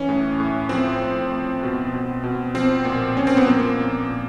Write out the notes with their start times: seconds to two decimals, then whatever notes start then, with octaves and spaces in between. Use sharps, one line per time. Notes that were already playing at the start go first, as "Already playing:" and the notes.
Already playing: E3 C#4
0.09 A2
0.40 A2
0.69 F3 C4
1.01 A2
1.32 A2
1.63 B2
1.94 B2
2.24 B2
2.54 F3 C4
2.85 A#2
3.16 A#2 C#4
3.27 C4
3.37 B3
3.47 F3 A#3
3.78 A#2
4.09 A#2